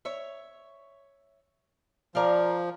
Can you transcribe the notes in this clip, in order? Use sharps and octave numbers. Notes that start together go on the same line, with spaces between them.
C#5 E5
F3 A#4 D5 F5